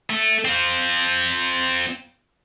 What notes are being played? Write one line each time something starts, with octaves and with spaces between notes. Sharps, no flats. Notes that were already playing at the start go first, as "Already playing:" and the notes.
A3
C4 F4